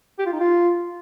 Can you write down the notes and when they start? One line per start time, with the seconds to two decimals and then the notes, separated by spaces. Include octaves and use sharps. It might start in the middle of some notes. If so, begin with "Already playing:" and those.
0.19 G4
0.26 F4
0.33 D#4
0.40 F4